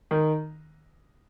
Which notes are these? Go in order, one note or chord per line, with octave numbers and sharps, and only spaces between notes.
D#3